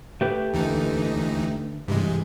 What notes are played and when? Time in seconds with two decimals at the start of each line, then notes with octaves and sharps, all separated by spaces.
0.21 A3 G4 B4
0.53 D#2 D3 E3 D#4 A4
1.88 G2 C3 E3 G3 G#3